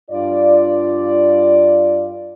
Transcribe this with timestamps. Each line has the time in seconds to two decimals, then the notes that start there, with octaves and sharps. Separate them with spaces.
0.10 G2 F4 D5